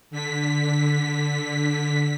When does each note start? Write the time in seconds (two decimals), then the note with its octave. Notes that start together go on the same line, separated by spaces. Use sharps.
0.11 D3 B6